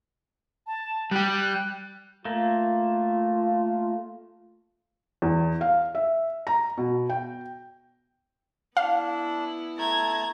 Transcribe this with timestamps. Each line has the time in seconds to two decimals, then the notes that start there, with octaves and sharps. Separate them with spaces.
0.67 A5
1.11 G3 G4 F#6
2.25 A3 A#3 F4
5.22 E2
5.61 F5
5.95 E5
6.47 A#5
6.78 B2
7.09 G5
8.77 B3 D4 E4 F5
9.77 A3 A5 A#5 G#6